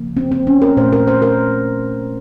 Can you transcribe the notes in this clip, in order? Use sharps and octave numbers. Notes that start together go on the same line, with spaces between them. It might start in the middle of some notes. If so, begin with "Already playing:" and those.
Already playing: C#3 F3 A#3
C4
C4
C#4
A#4
A#2 A3 C5
A#4
C5
A#4